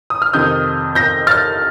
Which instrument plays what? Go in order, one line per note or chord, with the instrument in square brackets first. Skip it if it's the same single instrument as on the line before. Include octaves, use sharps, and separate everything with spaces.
[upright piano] D#6
F6
F2 C3 D#3 D#6 G6
G6 A#6
F6 A6